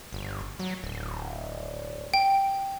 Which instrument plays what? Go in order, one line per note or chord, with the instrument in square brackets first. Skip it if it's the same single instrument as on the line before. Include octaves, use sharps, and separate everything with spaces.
[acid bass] G1
F#3
D1
[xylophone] G5